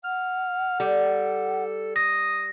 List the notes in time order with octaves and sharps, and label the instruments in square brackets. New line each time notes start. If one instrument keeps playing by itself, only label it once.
[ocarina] F#5 [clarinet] F6
[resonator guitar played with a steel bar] G3 [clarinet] A4
[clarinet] D#6 [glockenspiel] A#6